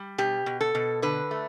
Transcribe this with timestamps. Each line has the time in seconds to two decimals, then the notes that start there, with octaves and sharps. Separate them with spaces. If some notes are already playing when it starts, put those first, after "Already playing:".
Already playing: G3
0.18 B2 G4
0.46 B2
0.61 A4
0.75 B2
1.02 D3 B4
1.31 A3